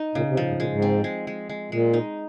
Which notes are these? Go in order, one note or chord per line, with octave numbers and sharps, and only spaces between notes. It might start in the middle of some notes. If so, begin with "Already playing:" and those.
Already playing: D#4
A#2 C#3
C3
A#2 F3
G#2
A#2 G#3
G#2
C4
G#3
G#3
G#3
A#2 G#3
D#4